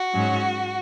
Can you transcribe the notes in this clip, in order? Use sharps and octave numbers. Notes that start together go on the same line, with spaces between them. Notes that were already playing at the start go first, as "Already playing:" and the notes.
Already playing: F#4
G#2 F#3 C#4